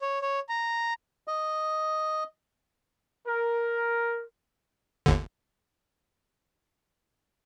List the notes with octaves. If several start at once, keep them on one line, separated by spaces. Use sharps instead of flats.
C#5
C#5
A#5
D#5
A#4
G1 D#2 D3